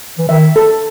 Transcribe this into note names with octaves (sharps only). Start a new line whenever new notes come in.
E3
D#3 E5
A4